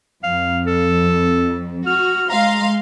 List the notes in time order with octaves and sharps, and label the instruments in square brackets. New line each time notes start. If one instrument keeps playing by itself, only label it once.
[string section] F2 [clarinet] F5
[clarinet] A4
[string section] F#4 [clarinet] F6
[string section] G#3 F5 C6 [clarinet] A#5